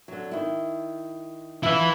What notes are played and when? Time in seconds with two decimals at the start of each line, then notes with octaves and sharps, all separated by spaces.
0.08 D3 F#3
0.31 D#3 E4
1.63 E4 F4 B4 E5